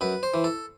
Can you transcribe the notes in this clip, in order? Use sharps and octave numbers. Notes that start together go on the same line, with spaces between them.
F#2 B4
C5
E3
A4